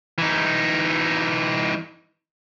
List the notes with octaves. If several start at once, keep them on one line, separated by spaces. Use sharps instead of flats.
E3 D#4